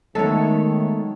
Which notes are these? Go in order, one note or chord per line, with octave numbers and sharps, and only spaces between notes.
D#3 F#3 G#3 A3 B3 A4 C#5